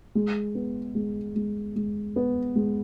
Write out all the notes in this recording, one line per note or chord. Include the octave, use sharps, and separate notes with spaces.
G#3
B3
G#3
G#3
G#3
B3
G#3